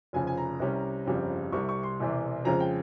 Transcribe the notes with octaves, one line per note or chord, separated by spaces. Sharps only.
F1 F2 C#3 F3 G#5
G#5
A#5
C2 C3 G3 C#4
G1 F2 C#3 G3 C4
C2 C3 G3 C#6
C#6
C6
E1 E2 C3 E3
F2 C#3 F3 G#3 C4 A#5
G5